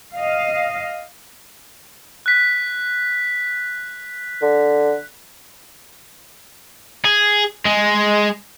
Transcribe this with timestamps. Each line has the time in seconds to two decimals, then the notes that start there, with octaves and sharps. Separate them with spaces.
0.15 D#5 F5
2.26 F#6 B6
4.42 D3
7.05 G#4
7.66 G#3